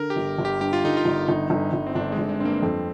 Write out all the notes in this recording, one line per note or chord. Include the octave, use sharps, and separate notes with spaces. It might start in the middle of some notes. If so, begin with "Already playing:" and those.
Already playing: D3 A#4
G4
G1
G1
G4
G2 G4
F4
D3 D#4
F4
G1
G1 D#4
G1
G1
C4
G1 D4
G#3
G1
G#3
G2 A#3 C4
F2 C4